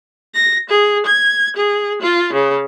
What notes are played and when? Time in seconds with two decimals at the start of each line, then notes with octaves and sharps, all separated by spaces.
0.34 A#6
0.68 G#4
1.06 G#6
1.57 G#4
2.01 F4
2.33 C#3